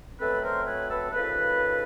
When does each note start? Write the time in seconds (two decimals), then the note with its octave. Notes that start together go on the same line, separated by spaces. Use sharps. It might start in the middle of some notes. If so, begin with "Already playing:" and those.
0.19 B2 F#3 A3 C4 A4 B4
0.42 A#4 C5
0.66 B4 C#5
0.89 A4 B4
1.12 D#2 C#3 F3 A4 B4